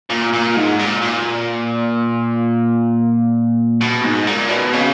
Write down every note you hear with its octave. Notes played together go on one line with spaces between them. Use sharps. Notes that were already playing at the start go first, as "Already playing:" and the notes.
A#2
A#2
G#2
A#2
A#2
B2
G#2
A#2
B2
C#3